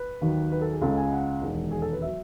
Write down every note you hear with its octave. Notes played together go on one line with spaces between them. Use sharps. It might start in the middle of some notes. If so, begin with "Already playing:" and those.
Already playing: B4
D#2 D#3 F#3
B4
A4
G#4
C#2 C#3 G#3 A4
G#5
F#5
E1 D#2 D#3 G#3
G#4
A4
B4
F#3 E5